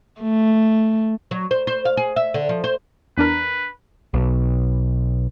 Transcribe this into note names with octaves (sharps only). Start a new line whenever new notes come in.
A3
F#3
C5
C5
F5
G#4
E5
D3
F3
C5
E2 D4 A#4 B4
B1